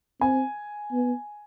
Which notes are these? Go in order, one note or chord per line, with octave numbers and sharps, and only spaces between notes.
C4 G#5
B3